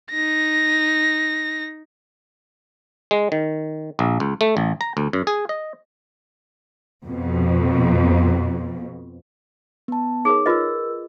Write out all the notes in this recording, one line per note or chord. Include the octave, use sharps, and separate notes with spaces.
D#4 A#6
G#3
D#3
A#1
C#2
A3
A1
A#5
D2
F#2
G#4
D#5
F2 B2
B3 A5
D#4 G#4 A#4 C#5
F4 A#4 B4 D#5 E6